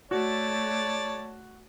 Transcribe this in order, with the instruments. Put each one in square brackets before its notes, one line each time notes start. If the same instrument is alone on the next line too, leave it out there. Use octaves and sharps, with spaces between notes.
[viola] A3 [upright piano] F#4 [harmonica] C#5 D5 A5